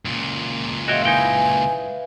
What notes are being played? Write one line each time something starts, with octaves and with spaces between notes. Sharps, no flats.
C#2 A#2
F4 F#4 G#4 C#5 D#5 E5 G5
D#4 E4 B4 G5 G#5